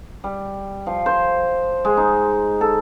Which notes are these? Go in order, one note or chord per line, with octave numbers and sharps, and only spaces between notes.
G3
F3
C5
G#3
D#4
A4